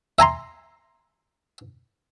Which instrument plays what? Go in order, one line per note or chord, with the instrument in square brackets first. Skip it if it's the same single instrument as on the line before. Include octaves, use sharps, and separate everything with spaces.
[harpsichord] E5 G#5 A#5 C6